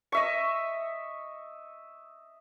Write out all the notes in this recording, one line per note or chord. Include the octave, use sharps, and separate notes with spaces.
D#5 E5 C#6